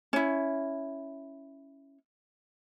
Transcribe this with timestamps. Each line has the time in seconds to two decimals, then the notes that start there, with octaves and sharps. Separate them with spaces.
0.13 C#4 E4